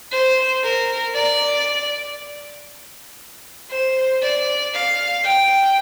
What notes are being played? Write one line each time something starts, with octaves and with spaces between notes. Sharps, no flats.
C5
A#4
D5
C5
D5
F5
G5